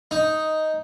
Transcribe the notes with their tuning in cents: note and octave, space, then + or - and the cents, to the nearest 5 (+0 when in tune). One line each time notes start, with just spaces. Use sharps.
D#4 +5